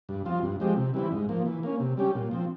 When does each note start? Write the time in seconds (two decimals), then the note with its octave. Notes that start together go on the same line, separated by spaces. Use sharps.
0.09 G2
0.25 F3 C4 F4
0.43 G2
0.60 F3 G#3 C4 G4
0.77 C3
0.94 E3 G3 C4 E4
1.12 G#2
1.29 F3 A#3
1.46 E3
1.63 A#3 C#4
1.80 C3
1.97 G3 C#4 G4
2.15 A#2
2.31 F3 C4